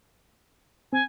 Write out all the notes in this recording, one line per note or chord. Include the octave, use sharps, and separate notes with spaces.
C4 G#5